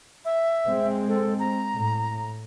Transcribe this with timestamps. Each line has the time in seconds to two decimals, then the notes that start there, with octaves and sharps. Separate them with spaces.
0.25 E5
0.66 G#3 C4
1.08 A4
1.39 A#5
1.72 A2